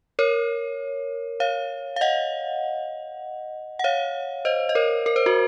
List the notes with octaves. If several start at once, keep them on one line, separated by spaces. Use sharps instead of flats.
A#4 C#5
C#5 F5
F5
D#5 F#5
F#5
C#5 F5
C5 D#5
D#5
A#4 C#5
A#4
C5
F#4 A#4